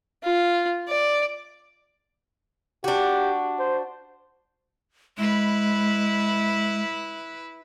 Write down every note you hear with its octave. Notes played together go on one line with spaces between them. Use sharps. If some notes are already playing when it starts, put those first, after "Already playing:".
F4
D5
D4 F#4 G4
C5
G#3 E4 B4